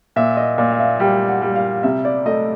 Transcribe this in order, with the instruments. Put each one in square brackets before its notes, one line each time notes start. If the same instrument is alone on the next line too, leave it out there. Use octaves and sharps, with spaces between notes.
[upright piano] A#2 [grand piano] E5
[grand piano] D#5
[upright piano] A#2 [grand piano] D5
[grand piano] F5
E5
[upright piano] G3 [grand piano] G5
[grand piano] F#5
[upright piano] G3
[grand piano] F5
[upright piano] C3 [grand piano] E5
[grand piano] D5
[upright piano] A3 [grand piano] D#5